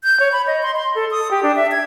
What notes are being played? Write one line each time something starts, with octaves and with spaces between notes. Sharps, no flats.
G6
C#5
B5
D#5
C6
C6
A4
D#6
G4
D4
E5
G#6